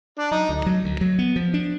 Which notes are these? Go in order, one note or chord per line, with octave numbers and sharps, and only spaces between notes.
D4
F#3 D#4
D2
F#3
D2
F#3
B3
F3
D4